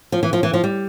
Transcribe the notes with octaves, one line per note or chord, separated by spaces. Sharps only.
F3
E3
F3
E3
F3
G3